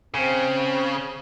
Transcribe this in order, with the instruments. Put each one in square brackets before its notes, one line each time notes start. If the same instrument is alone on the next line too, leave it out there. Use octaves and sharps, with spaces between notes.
[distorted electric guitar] C#3 [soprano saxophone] C4